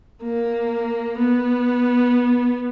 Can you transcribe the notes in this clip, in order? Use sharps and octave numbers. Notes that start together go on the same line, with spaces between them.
A#3
B3